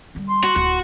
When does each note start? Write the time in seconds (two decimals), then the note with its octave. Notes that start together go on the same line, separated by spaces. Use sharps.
0.15 D3 G3
0.28 C6
0.44 F#4
0.56 D1 F#4